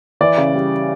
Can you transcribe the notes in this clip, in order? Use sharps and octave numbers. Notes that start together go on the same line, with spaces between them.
E3 D5
C#3
G3